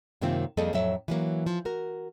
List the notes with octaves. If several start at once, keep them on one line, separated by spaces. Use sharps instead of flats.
F#2 C3 D#3 A#3 C4 F4
F2 G3 A#3 G#4 A4 D#5
F2 A2 F#3 E5
E3 F#3 A#3
F3
F#4 A#4